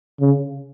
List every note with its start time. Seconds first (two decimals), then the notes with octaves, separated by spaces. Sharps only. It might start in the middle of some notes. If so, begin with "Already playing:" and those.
0.20 C#3